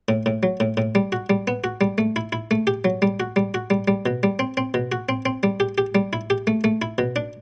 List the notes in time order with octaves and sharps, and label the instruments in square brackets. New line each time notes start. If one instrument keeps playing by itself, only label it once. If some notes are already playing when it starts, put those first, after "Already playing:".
[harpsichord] A2
A2
F#3
A2
A2
G3
F#4
G3
B3
F#4
G3
A3
E4
E4
A3
G4
F#3
G3
F#4
G3
F#4
G3
G3
B2
G3
C4
C4
B2
F#4
C4
C4
G3
G4
G4
G3
E4
G4
A3
A3
E4
B2
D4